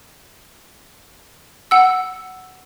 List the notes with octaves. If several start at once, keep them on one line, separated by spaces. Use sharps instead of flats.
F#5 E6